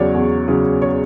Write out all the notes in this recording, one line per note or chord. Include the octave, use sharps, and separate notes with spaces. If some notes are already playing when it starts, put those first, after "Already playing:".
Already playing: E2 C#3 F#3 C#5 D5
E2
C#3 F#3
C#5